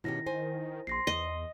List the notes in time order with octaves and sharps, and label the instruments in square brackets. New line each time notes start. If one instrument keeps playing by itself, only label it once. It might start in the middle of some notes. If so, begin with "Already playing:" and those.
[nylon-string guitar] B2 C#4 G4 [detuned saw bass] D#3 [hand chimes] E4 A#6
[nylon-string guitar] C5 G#5
[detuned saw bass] A#1 [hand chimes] C6 A#6 C7
[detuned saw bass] E2 [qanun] D#5